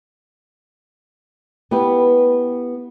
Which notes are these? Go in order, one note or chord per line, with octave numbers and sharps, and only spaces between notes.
B3 E4 G4 B4